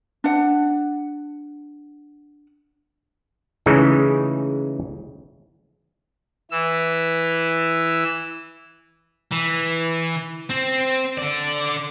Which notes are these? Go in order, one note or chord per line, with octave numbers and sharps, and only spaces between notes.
D4 F#5
C#3 E3 G#3 A3 D#4
E3 E6
E3
C4
D3 D5